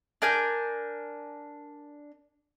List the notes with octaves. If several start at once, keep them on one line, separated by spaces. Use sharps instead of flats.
D4 A#4 G#5 G6